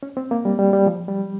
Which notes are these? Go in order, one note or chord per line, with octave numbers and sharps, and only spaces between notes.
C#4
C4
A#3
G3
G3
G3
F3
G3